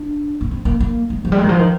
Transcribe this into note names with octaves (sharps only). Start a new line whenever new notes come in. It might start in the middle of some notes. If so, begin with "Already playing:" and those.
Already playing: D4
A#3
C4
A#3
A#3
G#3
F3
G3
G#3
D#3
F3
D#3